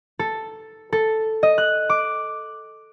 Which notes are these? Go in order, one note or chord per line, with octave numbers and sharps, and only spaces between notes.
A4
A4
D#5
F#6
D6